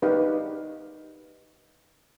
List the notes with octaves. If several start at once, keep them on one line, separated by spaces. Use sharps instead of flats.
D#4 G4 B4 D5 F5